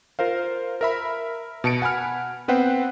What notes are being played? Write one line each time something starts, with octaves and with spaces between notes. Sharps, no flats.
F4 A#4 C5 F5
A#4 E5 B5
B2 A5 C#7 D7
F#5 G#5 B5 F6
B3 C4 B4 C5 F#5 G5